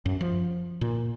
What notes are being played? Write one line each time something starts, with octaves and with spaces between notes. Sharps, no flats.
F#2
F3
A#2